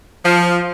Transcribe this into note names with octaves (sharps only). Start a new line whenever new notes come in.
F3